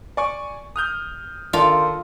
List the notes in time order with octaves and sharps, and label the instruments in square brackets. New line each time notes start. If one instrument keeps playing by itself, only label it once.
[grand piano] D5 G#5 C#6
D#6 F6 G6
[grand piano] D#3 A4 D5 [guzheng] F4